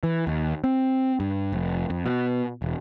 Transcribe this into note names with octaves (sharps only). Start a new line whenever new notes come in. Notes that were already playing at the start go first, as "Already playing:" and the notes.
E3
D#2
C4
G2
F1
F2
B2
E1